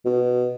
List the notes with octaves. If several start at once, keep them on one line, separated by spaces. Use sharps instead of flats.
B2